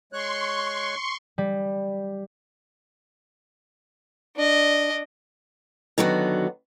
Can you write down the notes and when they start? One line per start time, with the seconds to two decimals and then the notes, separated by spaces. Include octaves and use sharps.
0.13 G#3 C#5 C6 C#6 F#6
1.38 G3
4.36 D4 D#5
5.98 D3 D#3 F#3 B3 F#4